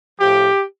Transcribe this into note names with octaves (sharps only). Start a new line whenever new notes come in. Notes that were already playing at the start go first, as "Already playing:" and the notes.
A2 F3 G4